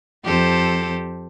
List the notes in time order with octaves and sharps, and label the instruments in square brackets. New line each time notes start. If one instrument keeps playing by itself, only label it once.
[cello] F2 [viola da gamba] G4 A4 C5